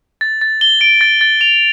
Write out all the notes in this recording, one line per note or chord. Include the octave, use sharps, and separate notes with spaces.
A6
A6
G7
D7
A6
A6
F7